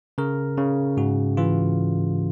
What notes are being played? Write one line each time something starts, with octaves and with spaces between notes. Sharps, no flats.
C#3 A#4
C#3
G#2 F#4
E3 F4